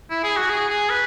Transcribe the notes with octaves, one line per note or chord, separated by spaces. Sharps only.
E4
G#4
F#4
G#4
G#4
B4